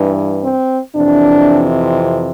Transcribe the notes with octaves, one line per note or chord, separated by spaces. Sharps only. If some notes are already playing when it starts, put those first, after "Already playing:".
Already playing: G2 E3
C4
F2 C3 E3 D4